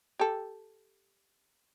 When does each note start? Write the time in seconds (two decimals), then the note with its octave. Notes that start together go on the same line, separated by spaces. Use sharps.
0.19 G4 A4